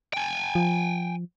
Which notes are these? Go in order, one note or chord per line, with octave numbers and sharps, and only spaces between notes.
G5 G#5
F3